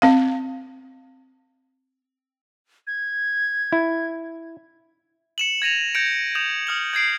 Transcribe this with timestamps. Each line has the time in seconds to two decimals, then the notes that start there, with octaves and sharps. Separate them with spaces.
0.02 C4 F5
2.87 G#6
3.73 E4
5.38 C#7 E7 F#7
5.62 G#6 A#6 D#7 F7
5.95 G6 G#6 A#6 C#7 D7
6.35 D#6 G6 E7 F7
6.67 D#6 F6 F#7
6.93 G6 G#6 C7 D7